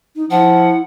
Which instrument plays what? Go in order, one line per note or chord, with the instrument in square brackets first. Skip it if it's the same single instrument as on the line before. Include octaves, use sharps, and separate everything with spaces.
[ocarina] D#4
[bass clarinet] F3 [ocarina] E4 [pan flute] F#5